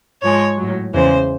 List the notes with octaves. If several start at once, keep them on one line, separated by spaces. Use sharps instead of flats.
G#2 F3 G#3 C#5
A2 F#3
E2 C#3 E3 G#3 C5